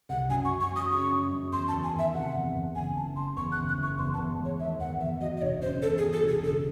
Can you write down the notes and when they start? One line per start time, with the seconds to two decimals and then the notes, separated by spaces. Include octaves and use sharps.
0.09 C2 F#5
0.29 F#2 G#5
0.45 C#6
0.51 F#2
0.61 C#6
0.71 F#3 D#6
0.91 C#3 C#6
1.11 F#2
1.32 F#2
1.52 E2 C6
1.68 A5
1.73 E2
1.83 G#5
1.93 D#3
1.99 E5
2.14 C3 F#5
2.35 E2
2.55 E2
2.75 F#1 G#5
2.96 F#1 A5
3.16 C#3 C6
3.37 E2 C#6
3.52 F#6
3.57 F#1
3.68 F#6
3.78 F#1 C#6
3.98 E2 C6
4.14 A5
4.18 E2
4.39 G#3
4.45 C#5
4.59 D#3 E5
4.80 E2 F#5
5.00 E2 E5
5.21 F#3 D#5
5.37 D#5
5.42 E1 C#5
5.62 C#3 C5
5.82 E2 A4
5.98 G#4
6.02 F#3
6.13 A4
6.24 E1 G#4
6.43 F#1 A4